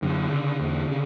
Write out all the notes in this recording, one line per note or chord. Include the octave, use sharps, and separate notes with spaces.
F#2 D3
C#3
E2
C#3